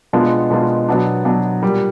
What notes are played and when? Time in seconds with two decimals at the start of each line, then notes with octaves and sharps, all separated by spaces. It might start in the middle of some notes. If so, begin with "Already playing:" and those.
0.13 B2 G#3 B3 D4 F4
0.50 B2 G#3 B3 D4 F4
0.88 B2 F#3 B3 D4
1.25 B2 F#3 B3 D4
1.63 A#2 G3